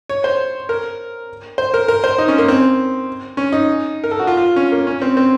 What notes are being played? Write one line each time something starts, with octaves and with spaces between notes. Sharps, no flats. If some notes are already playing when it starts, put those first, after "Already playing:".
C#5
C5
A#4
C5
A#4
A#4
C5
D#4
C#4
A#3
C4
C#4
D#4
A#4
A4
F#4
F4
F4
C#4
A#3
C#4
C4
C4